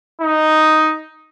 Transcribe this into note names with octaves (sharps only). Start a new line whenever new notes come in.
D#4